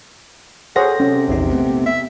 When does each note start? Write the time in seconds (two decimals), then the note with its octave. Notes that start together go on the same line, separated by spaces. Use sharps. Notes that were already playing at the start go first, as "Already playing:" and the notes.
0.76 G#4 A4 C5 C#5 F#5 A#6
1.00 C3 C#4
1.28 A#1 E2 D#4
1.50 A3 B3 C4
1.86 E5